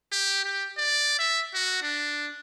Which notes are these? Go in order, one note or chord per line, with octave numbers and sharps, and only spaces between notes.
G4
G4
D5
E5
F#4
D4